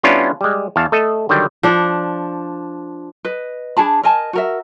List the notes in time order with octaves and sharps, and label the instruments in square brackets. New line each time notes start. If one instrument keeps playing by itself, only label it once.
[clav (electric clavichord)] G3 B3 C#4 D4 E4 F4
G3 G#3
E2 F5 A5
A3 A4 D#5
D3 D#3 F#3 G3 G5
[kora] F3 D4
[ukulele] B4 D#5
D4 G#4 A5 B5
A#4 D#5 G#5 A5
F#4 A#4 E5